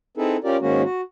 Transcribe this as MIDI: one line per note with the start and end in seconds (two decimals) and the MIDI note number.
0.17 0.37 60
0.17 0.37 63
0.17 0.37 64
0.17 0.37 68
0.17 0.37 69
0.17 0.37 71
0.44 0.57 61
0.44 0.57 65
0.44 0.57 67
0.44 0.57 70
0.44 0.57 74
0.61 0.83 44
0.61 0.83 51
0.61 0.83 56
0.61 0.83 58
0.61 0.83 61
0.61 0.83 66
0.83 1.01 66